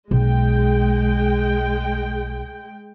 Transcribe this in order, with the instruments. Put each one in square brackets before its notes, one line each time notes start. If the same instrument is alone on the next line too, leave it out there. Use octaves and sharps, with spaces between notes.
[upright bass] B1 [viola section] G#3 G5